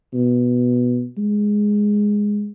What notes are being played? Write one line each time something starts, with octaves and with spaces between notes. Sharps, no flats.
B2
G#3